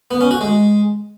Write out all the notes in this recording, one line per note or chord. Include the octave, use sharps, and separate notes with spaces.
B3
C#4
F#4
G#3